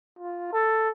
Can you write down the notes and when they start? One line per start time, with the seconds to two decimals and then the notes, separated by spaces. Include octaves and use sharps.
0.19 F4
0.53 A4